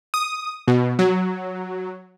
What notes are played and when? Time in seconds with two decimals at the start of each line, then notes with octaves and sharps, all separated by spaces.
0.14 D#6
0.68 B2
0.99 F#3